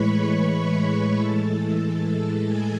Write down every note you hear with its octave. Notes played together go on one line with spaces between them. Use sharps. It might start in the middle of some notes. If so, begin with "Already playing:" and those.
Already playing: A2 E3 G#3 B4 C#5 B5 C#6
B4 B5
A2 E3 G#3 A4 A5
G#4 G#5